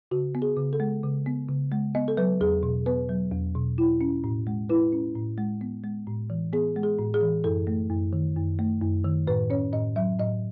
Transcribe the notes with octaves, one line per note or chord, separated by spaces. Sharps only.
C#3 F#4
B3
G#4
C#3
A4
G#3
C#3
B3
C#3
G#3
B3 D#5
A4
F#3 B4
E2 G#4
B2
B3 B4
F#3
E2
B2
E4
C#4
A2
G#3
E4 B4
C#4
A2
G#3
B3
G#3
A2
E3
B3 G#4
G#3
G#4
A2
G#4
E3
F#2 A4
A3
F#2
D#3
F#2
A3
F#2
D#3
A2 B4
C#4 C#5
A2 D#5
F#3 E5
A2 D#5